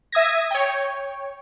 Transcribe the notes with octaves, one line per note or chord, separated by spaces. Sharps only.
E5 D#6 G#6 A#6
C#5 G5